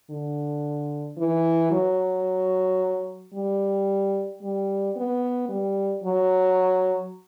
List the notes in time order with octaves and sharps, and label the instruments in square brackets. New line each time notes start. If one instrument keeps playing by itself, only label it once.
[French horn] D3
E3
F#3
G3
G3
B3
G3
F#3